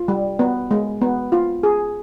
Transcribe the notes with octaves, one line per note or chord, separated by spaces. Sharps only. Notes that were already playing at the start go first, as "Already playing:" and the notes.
Already playing: F4
G3
B3
G#3
B3
F4
G#4